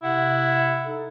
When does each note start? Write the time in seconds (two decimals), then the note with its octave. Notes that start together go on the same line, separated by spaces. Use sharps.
0.03 C3 E4 F#5
0.86 D#4 A4